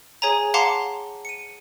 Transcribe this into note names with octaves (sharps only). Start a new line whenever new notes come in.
G#4 C#5 G#5 A#5
F5 F#5 A5 A#5 C6 D6
C#7 D#7